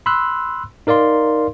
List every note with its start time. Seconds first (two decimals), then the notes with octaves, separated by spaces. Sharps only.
0.06 B5 C6 E6 F#6
0.87 D#4 A#4 D5 F5 C6